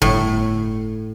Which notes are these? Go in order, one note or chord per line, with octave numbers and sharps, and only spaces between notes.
G1 A2